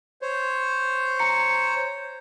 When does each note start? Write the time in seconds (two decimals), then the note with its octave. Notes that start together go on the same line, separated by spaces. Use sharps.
0.22 C5 C#5
1.20 A#5 C#7